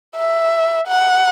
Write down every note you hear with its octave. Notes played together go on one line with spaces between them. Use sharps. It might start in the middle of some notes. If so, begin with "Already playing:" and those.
E5
F#5